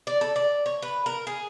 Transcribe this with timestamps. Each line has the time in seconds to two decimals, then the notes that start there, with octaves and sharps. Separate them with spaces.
0.07 D5
0.21 A4
0.36 D5
0.66 C#5
0.82 B4
1.06 A#4
1.27 G#4